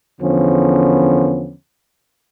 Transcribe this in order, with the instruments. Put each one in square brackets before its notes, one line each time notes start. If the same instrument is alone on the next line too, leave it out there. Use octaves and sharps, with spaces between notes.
[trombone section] E2 D3 F3 B3 C#4